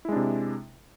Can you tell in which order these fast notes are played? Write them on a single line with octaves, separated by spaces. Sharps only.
E4 G#3 D4 C3